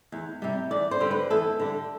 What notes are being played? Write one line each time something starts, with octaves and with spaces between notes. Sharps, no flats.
E2
C3 G3
E2 D5
C5
D3 G3
B4
E2 A4
D3 G3